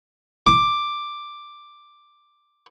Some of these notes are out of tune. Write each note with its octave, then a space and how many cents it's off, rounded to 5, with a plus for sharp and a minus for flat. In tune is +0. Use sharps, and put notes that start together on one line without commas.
D6 +5